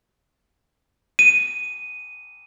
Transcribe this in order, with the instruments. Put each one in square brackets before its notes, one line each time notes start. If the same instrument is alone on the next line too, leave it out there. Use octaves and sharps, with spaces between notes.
[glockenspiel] D#7